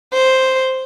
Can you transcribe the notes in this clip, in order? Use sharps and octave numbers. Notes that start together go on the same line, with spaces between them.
C5